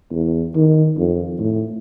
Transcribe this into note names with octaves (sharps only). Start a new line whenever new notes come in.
E2
D#3
F2
A2